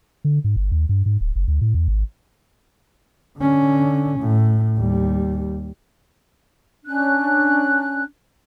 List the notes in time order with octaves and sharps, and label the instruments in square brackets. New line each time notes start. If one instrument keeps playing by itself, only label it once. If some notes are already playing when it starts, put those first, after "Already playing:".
[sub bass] D3
G#2
G1
D#2
G2
G#2
D1
F#1
D2
A2
E2
G#1
[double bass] D3 C#4
A2
D#2 G3
[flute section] C#4 D4 F#6